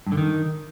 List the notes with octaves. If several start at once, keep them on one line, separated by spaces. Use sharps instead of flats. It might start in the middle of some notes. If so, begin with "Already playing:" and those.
G2
D3
D#3